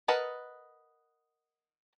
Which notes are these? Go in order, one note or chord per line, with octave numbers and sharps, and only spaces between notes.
A#4 B4 D#5 F#5 A5